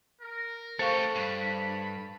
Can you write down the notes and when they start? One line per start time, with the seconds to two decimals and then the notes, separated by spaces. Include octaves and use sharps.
0.21 A#4
0.79 A3 G4 A4 C5 F5 C#6
1.15 G2 B5